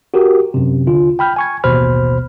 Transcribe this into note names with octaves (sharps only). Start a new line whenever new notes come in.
F#4 G4 A#4
F#2 C3
D#2 D3 F4
G5 B5 F6 G6
G#5 C#6 G#6
A1 D#2 B2 C5 B5 F6